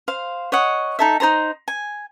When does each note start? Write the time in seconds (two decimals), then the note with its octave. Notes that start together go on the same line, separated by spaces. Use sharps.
0.08 C5 F5
0.52 C#5 D#5 F#5
0.99 D#4 A4 E5
1.20 D#4 A4 C5 A#5
1.68 G#5